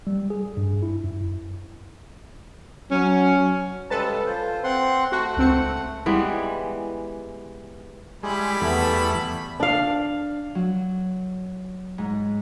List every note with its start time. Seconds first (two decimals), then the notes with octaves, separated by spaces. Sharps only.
0.07 G3
0.30 G#4
0.57 G2
0.82 E4
1.04 F#2
2.91 F#3 C#4
3.90 C#3 G3 G#3 A4 B4 A5
4.26 F4 C5
4.64 C4 F#5 C6
5.12 A3 F#4 F#5
5.37 C#2 C4 C#7
6.06 E3 G3 G#3 B3
8.23 G3 G#3 E4 B5
8.61 E2 A3 B3
9.60 D4 F5
10.55 F#3
11.98 G#2